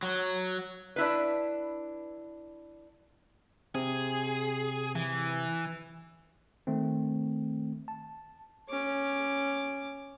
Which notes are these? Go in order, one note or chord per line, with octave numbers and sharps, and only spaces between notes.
F#3
D4 E4 B4
C3 C4 G#4
E3
D#3 A3 C4
A5
C#4 D6